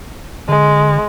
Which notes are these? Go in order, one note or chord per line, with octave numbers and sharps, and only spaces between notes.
D3 G#3